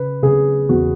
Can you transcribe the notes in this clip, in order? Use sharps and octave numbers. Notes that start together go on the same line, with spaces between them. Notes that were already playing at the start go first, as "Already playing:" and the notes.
Already playing: C#3 B4
C#3 G#4
E2 F#4